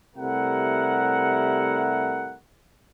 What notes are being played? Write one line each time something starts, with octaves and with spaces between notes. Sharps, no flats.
C3 G3 A3 E4 A#4 F#5